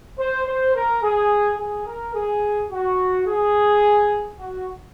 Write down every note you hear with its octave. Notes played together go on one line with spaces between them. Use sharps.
C5
C5
A#4
G#4
G#4
A#4
G#4
F#4
G#4
F#4